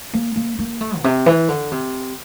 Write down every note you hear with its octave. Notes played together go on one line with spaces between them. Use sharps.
A#3
A#3
A#3
A3
A#2
C3
E3
D3
C3